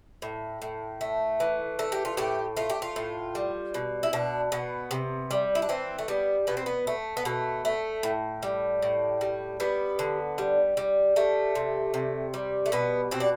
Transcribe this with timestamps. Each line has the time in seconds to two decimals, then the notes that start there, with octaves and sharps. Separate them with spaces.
0.22 A2
0.62 A2
1.01 A3
1.40 E3
1.79 A3 A4
1.92 G4
2.05 F4
2.17 A2 G4
2.57 A3 F4
2.70 G4
2.82 F4
2.96 A2
3.35 G3
3.74 B2
4.03 E4
4.13 B2 D4
4.52 B2 B3
4.91 C3
5.31 G3
5.55 E4
5.62 D4
5.69 E3 C4
5.99 A3
6.08 G3 B3
6.47 B2 B3
6.57 C4
6.66 B3
6.87 A3
7.17 B3
7.25 B2 A3
7.65 A3
8.03 A2
8.43 G3
8.82 A2
9.21 G3
9.60 G3 B3
9.99 D3
10.38 G3
10.77 G3
11.16 G3 A3
11.55 C3
11.94 C3
12.34 G3
12.66 A3
12.72 B2 B3
13.11 B2 C4
13.20 D4